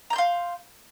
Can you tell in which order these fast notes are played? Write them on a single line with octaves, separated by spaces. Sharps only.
A#5 G6 C6 F5